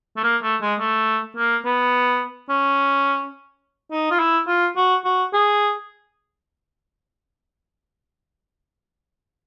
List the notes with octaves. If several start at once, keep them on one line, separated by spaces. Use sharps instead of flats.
A3
A#3
A3
G#3
A3
A#3
B3
C#4
D#4
F4
E4
F4
F#4
F#4
G#4